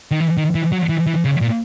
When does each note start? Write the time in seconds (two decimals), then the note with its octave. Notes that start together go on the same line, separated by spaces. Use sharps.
0.11 D#3
0.20 E3
0.37 D#3
0.55 E3
0.72 F#3
0.89 E3
1.07 E3
1.25 C#3
1.41 A#2